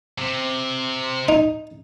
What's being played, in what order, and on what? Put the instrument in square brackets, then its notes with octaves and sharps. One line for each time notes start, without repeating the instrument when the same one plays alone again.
[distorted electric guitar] C3
[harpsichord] D#4